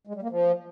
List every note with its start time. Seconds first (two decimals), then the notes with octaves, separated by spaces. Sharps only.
0.07 G#3
0.15 G3
0.22 A#3
0.30 F3